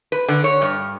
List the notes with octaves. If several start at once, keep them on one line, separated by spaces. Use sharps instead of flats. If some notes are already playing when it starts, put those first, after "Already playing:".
B4
D3
C#5
G2